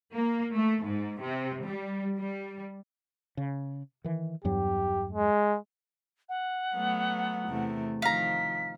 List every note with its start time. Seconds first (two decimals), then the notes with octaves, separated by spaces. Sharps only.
0.13 A#3
0.54 A3
0.84 G#2
1.22 C3
1.66 G3
2.17 G3
3.37 C#3
4.04 D#3 E3
4.44 E2 G2 F#3 G4
5.12 G#3
6.29 F#5
6.74 F#3 A3 B3
7.48 E2 C3 A3
8.02 D#3 F3 F5 A#5 B6